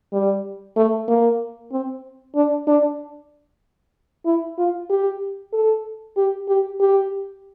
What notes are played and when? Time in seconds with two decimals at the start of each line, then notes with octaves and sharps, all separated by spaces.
0.13 G3
0.77 A3
1.08 A#3
1.72 C4
2.36 D4
2.67 D4
4.26 E4
4.58 F4
4.90 G4
5.53 A4
6.17 G4
6.48 G4
6.80 G4